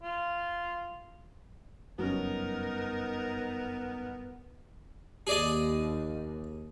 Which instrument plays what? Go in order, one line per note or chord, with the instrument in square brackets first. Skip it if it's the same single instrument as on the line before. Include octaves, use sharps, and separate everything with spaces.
[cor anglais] F4
[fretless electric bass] F#1 G2 [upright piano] F#3 C#4 [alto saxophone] B3 [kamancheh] D#4 A#4
[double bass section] D#2 [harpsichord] G#4 D5 D#5